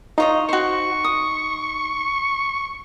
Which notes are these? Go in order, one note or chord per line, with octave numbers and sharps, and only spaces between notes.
D#4 F4 C#5 D#5
F#4 C5 C#6
D#6